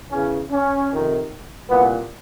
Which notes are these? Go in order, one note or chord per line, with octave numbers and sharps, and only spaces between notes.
E2 C#3 E3 C#4
C#4
F2 C3 D#3
C2 A#2 B3